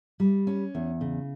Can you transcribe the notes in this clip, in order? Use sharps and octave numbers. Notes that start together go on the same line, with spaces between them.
G3
C#4
E2
C#3